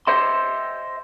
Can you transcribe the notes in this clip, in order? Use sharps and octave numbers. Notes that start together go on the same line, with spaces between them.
C5 D#5 E5 C6